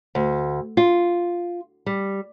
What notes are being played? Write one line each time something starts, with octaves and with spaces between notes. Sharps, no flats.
D2
F4
G3